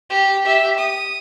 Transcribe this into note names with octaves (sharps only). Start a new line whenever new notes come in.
G4
G4 E5
D#6